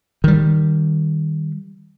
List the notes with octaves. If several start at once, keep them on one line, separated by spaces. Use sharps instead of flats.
D#3 G3